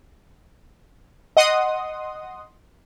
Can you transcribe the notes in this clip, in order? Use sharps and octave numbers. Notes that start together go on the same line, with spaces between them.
D#5 F#5 C6 D#6